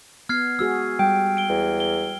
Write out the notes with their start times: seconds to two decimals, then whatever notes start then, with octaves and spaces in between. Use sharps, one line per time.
0.29 B3 F6 G#6 C7
0.59 G#3 F#4 G#4 E6
0.99 G3 G5
1.37 D7 G7
1.50 E2
1.80 G7